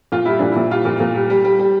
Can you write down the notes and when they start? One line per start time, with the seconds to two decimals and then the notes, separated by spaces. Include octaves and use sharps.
0.12 A#2 F4
0.25 G3 E4
0.39 A#2 D4
0.52 A#2 E4
0.71 G3 F4
0.85 A#2
1.00 A#2
1.15 G3
1.30 G3
1.45 G3
1.59 G3